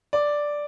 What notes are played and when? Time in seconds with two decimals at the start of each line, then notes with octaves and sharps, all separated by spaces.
0.13 D5